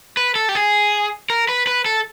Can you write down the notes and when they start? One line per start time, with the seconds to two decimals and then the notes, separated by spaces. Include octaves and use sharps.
0.17 B4
0.35 A4
0.49 G4
0.55 G#4
1.30 A#4
1.49 B4
1.67 B4
1.86 A4